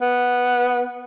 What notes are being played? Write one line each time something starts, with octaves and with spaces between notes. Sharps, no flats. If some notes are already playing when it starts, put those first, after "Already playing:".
B3